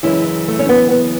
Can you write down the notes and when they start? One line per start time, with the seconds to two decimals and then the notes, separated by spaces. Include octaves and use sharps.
0.03 F#2 C#3 E3 G#3 C#4 E4
0.48 A3
0.59 C#4
0.69 B3
0.91 B3